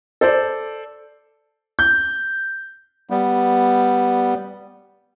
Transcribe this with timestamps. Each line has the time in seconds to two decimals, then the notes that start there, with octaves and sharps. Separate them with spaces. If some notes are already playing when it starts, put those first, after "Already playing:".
0.21 A4 C5 D5
1.79 G6
3.10 G3 B3